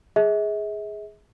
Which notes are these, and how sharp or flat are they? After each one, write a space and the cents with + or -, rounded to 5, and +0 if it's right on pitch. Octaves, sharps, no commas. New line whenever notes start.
G#4 +0 E5 -45